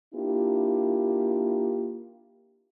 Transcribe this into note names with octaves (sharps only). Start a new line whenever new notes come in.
A#3 D4 E4 F4 G4